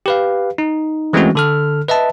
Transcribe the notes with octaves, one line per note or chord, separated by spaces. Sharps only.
G4 B4 F5
D#4
E3 G#3 A3 C4 C#4 F#4
D3 A4 F6
B4 D#5 E5 A5